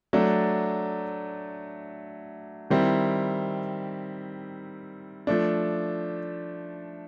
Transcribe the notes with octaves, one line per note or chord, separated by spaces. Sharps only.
F#3 A3 D4
D#3 G3 C4 E4
F3 A3 D4